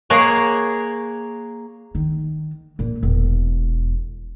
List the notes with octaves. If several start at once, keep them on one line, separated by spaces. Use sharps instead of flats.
A#3 G#4 C#5 F#5
D#3
A#2
E1